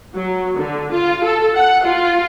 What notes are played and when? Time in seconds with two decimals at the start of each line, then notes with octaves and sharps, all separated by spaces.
0.15 F#3
0.57 D3
0.92 F4
1.24 A4
1.56 F#5
1.86 F4